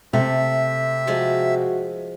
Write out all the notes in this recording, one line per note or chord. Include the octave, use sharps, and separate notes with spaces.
C3 A3 E5
F3 G#3 F#4